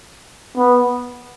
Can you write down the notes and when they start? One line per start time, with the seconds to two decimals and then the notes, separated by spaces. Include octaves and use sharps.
0.57 B3